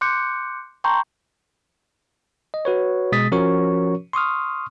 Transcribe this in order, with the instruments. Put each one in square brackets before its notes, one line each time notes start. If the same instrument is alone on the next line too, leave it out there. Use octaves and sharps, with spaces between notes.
[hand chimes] C6 D6 F#6 G6 C#7
G5 A5 A#5 C6 C#6 G6
[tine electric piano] D#5
F#4 B4 C#5
B2 G#3 D#6 A6 B6
F3 C#4 F#4 A#4 C#5 C#6
C6 C#6 D#6 F6